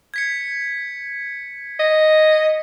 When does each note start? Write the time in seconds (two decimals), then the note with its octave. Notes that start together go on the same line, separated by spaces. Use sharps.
0.14 G#6 B6 C#7
1.80 D#5